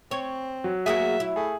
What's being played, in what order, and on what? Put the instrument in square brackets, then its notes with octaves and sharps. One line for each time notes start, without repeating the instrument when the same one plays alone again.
[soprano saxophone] C4 [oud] C#5
[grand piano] F#3
[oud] A#3 F#4 G#4 [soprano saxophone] E5
[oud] E4
[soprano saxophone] A3 [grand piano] G#4